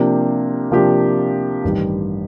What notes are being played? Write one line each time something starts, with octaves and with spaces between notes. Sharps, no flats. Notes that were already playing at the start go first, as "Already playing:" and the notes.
Already playing: C3 F3 A#3 D4 G4
C3 F3 A#3 D4 G4
A1 G2 D#3 G3